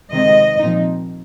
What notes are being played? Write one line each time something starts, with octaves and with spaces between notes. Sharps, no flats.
C3 D#3 G#3 C4 D#5
A#2 F3 C4 D#4